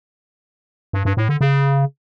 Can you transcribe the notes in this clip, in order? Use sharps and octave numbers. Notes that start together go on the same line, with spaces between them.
G2
G2
A2
D3
C#3